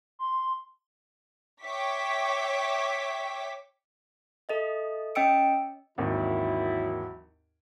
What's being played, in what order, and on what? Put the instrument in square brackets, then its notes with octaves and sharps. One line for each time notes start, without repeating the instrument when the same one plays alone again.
[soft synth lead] C6
[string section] C#5 E5 G5 C#6 D6 B6
[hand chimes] A4 D#5 E5
C#4 D#5 G5 E6 C#7 D7
[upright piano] G#1 D#2 [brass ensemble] E3 F#3 E4